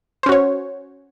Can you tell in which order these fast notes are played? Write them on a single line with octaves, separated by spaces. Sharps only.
C5 C#4 F#4 C#5